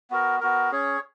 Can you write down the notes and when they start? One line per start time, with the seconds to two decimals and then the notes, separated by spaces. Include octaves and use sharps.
0.10 B3 F#4 A#4
0.40 B3 F#4 A#4
0.71 C#4 G#4 C#5